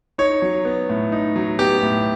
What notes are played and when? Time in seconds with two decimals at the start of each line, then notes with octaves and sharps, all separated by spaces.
0.18 D#4 C#5
0.42 F#3
0.65 B3
0.89 A2
1.12 D#4
1.36 F#3
1.59 B3 G4
1.83 A2